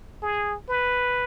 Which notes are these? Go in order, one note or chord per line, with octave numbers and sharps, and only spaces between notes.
G#4
B4